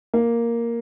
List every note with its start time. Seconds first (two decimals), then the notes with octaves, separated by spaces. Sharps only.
0.14 A#3